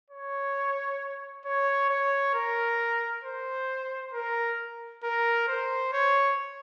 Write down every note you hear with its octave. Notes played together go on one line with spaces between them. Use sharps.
C#5
C#5
C#5
A#4
C5
A#4
A#4
C5
C#5